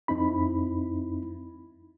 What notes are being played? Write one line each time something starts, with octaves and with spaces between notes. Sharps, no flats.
F2 C4 D#4 E4 B5